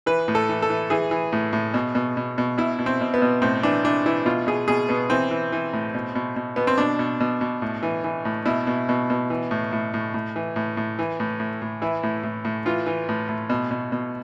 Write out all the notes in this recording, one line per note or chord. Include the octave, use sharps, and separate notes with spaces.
E3 B4
A2
A4
E3
A4
E3
E3 G#4
E3
A2
A2
B2
B2
B2
B2
B2 E4
B2
C4
B2
B3
B2
A2 C4
E3 D4
E3 D4
E3 E4
B2 F4
B2 G#4
B2 G#4
B2 B3
E3 C4
E3
E3
A2
B2
B2
B2
B2 B3
C4
B2 D4
B2
B2
B2
A2
E3
E3
A2
B2 E4
B2
B2
B2
E3
A2
A2
A2
A2
E3
A2
A2
E3
A2
A2
A2
E3 E4
A2
A2
A2
E3 F4
E3
A2
A2
B2
B2
B2